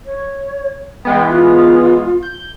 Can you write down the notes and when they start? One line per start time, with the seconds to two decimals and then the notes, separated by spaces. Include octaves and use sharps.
0.06 C#5
1.05 E3 G#3 B3 G5
1.30 F4
2.23 G6